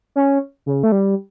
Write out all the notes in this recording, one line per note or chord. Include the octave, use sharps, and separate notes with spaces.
C#4
C#3
A3
G3